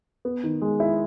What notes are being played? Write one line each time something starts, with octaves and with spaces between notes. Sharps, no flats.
B3
D#3
G#3
E4